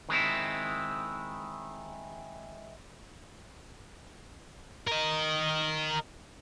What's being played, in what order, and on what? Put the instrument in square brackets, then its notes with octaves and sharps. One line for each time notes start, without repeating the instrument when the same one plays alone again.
[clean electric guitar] D#3 G#3 C4 E4
[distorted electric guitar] A#4 D#5